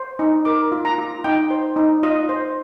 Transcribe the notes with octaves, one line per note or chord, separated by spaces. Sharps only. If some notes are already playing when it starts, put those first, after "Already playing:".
Already playing: C5
D#4
A#4 D6
F4
A#5
F4
D#4 G5
C5
D#4
F4 D#5
C5